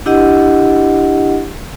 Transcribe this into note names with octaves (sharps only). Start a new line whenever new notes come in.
D4 E4 G4 D#5 F#5